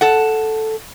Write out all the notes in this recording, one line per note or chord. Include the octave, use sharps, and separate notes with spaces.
A4 F#5